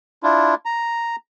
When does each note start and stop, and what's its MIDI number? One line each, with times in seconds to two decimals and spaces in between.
0.23 0.55 62
0.23 0.55 64
0.23 0.55 65
0.65 1.16 82